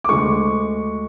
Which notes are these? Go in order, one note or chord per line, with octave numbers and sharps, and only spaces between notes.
D6
D2 D3 G#3 C#6